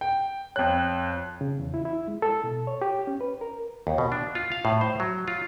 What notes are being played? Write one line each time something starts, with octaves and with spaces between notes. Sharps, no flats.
G5
F2 C#5 G5 F#6
C#3
E2
E4
E4
G#3
A4
B2
C#5
G4
C#4
B4
A#4
D#2
B2
D4
F4
F5
A2
C5
F#3
F4